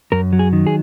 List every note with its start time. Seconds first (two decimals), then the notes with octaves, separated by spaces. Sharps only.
0.12 F#2 A#4
0.33 F#3
0.39 G#4
0.53 D#3
0.67 G#4